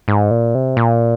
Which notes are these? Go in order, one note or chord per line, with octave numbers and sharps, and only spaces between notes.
G#2
A#2
C3
A#2